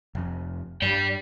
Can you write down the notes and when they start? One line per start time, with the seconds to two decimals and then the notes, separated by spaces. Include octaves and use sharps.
0.15 F1 F2
0.82 G2 G3 D5 G5